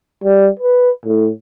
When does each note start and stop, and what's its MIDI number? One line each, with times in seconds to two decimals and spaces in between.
0.24 0.48 55
0.59 0.91 71
1.06 1.30 45